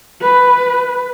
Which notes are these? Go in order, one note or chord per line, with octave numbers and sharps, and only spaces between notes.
B4